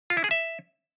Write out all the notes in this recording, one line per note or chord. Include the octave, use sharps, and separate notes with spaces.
F4
E4
G#4
E5